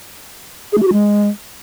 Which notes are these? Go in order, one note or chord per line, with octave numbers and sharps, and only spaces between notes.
G#4
A3
G4
F#4
G#3